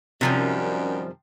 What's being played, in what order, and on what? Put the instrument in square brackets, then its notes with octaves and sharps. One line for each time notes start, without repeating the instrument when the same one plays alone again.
[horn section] F#2 D#3 G3 [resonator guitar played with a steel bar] C3 F3 C#4